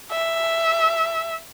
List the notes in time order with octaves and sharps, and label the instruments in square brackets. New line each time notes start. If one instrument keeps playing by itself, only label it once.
[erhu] E5